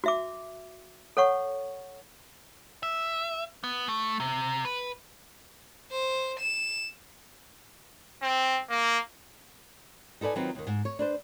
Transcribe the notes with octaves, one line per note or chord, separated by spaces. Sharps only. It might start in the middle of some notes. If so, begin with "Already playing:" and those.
F#4 E5 D6
A4 C#5 F#5 C#6
E5
B3
A3
C3
B4
C5
E7
C4
A#3
D#4 A4 B4 D5 G#5
D#3 F#3 C4 D#4 F4 B4
D#2 D#3
G#2
C#5
D4 B4 C5